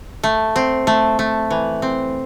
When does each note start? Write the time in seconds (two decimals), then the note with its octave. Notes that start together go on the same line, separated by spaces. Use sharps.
0.24 A3
0.56 C4
0.87 A3
1.19 A3
1.51 E3
1.82 C4